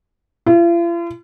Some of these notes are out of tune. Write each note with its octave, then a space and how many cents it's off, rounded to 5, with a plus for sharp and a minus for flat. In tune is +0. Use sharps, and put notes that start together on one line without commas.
F4 -45